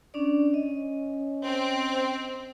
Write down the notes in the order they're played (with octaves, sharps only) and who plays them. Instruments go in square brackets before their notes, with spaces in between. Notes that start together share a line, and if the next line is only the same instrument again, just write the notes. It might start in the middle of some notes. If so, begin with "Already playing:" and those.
[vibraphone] C#4 D4 D5
[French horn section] C#4 [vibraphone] D#5
[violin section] C4